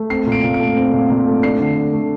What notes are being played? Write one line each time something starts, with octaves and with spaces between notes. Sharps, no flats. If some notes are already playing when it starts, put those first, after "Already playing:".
Already playing: A3
C4 C7
A#2
D7
A#2
D7
A3
C4
A#2
A#2
A3
D4 C7
D3
D3
A3